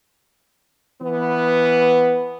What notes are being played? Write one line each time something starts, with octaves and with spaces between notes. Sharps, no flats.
E3 B3